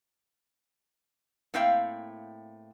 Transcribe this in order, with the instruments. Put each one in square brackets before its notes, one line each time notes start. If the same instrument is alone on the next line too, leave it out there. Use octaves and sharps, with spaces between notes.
[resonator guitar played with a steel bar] A2 A#3 C4 E5 F5 G5